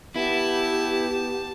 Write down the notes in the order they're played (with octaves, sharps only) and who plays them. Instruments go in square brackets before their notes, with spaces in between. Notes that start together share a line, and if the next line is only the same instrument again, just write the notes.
[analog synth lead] B3 [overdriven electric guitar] E4 [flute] G4 [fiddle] A5